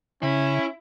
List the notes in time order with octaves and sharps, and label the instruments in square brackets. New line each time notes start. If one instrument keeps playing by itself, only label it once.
[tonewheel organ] C#3 [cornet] C#4 [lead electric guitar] E4